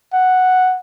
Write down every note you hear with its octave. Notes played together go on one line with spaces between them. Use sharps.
F#5